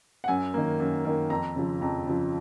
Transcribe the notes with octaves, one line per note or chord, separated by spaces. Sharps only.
F#5
F#2 G#5
D#3 A#3
F#2
D#3 A#3
F2 A#5
C#3 F3
F2 A#5
C#3 F3